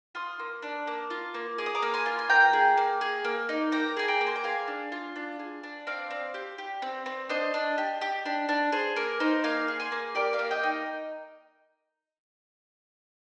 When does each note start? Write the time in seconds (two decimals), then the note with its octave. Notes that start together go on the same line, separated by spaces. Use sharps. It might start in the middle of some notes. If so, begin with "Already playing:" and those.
0.15 F4 C6 D#6
0.39 A#3
0.62 D4
0.87 A#3
1.10 F4
1.34 A#3
1.58 G#4 D6
1.66 D#6
1.75 A#5 D6
1.82 A#3
1.94 G#5 C6
2.06 F4
2.19 G#5
2.30 A#3 G5 A#5
2.53 G#4
2.77 A#3
3.01 G#4
3.25 A#3
3.49 D#4
3.72 A#3 G5 A#5
3.96 G#4 G#5
4.08 G5 A#5
4.21 A#3
4.27 C6
4.36 A#5
4.44 G#4 F5 G#5
4.68 D4
4.92 F4
5.16 D4
5.39 G#4
5.63 D4
5.87 C4 D5 F5
6.11 C4
6.34 G4
6.58 G4
6.82 C4
7.06 C4
7.29 D4 C5 D#5
7.54 D4
7.78 G4
8.01 G4
8.26 D4
8.49 D4
8.72 G#4 C5
8.96 A#3 A#4
9.20 D#4 C5
9.44 A#3 F5 G#5
9.68 G#4
9.80 G#5 C6
9.92 A#3
10.15 G4 A#4 D5
10.33 D5 F5
10.39 A#3
10.51 D#5 G5
10.63 D#4